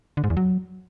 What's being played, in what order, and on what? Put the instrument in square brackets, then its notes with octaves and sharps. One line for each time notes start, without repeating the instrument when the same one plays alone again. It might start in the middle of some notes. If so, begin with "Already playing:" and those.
[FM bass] D3
G#2
E2
F#3